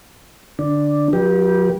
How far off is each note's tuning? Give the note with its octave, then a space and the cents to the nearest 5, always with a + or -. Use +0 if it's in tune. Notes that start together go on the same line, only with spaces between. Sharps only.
D3 +0 D4 +0
F#3 -45 G4 +0 B4 -40